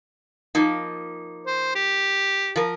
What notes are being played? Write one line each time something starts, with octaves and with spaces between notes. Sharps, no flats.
F3 A#3 D#4
C5
G4
F3 A#4